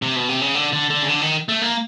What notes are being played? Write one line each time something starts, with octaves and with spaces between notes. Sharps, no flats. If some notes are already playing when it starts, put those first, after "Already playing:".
C3
B2
C3
C#3
D3
D3
D3
C#3
D3
D#3
A3
A#3